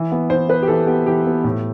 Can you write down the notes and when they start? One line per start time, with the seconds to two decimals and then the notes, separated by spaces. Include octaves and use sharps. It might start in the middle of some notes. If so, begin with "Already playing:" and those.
Already playing: E3
0.12 B3
0.30 E3 C5
0.49 B3 B4
0.62 G4
0.68 E3 A4
0.87 B3 G4
1.06 E3 G4
1.26 B3
1.44 A2